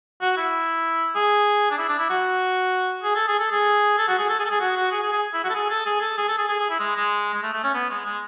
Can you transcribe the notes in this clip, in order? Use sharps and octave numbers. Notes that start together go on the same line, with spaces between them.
F#4
E4
G#4
D4
E4
D4
E4
F#4
G#4
A4
G#4
A4
G#4
A4
F#4
G#4
A4
G#4
A4
G#4
F#4
F#4
G#4
G#4
G#4
E4
F#4
A4
G#4
A4
G#4
A4
G#4
A4
G#4
G#4
G#4
E4
G#3
G#3
G#3
A3
A3
C#4
B3
G#3
G#3